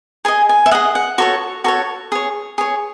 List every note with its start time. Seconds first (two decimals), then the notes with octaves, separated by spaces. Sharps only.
0.25 G#4 D#5 G#5
0.49 G#5
0.66 E5
0.71 G#4 D#5 F#5
0.95 F#5
1.18 F#4 A4 C#5 C#6
1.64 F#4 A4 C#5 C#6
2.12 G#4 C#5
2.58 G#4 C#5